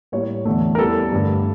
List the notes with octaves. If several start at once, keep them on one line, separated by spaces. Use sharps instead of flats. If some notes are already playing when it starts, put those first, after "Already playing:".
A2 G3 A#3 C#5
E2 D3 A3
A#4
E2 E3 G3 A4
G2 D3 A3